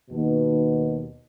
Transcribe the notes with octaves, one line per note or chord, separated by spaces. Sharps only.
D#2 B2